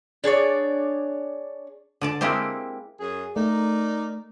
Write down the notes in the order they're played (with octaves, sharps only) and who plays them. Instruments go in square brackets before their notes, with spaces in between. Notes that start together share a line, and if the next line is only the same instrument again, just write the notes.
[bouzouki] D4 G#4 C#5 D5
[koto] D3 D5 A5
G#3 A#3 C4 E4 G4 C5
[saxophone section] F#2 G#4
[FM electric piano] A3 [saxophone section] D#4 A#4 D5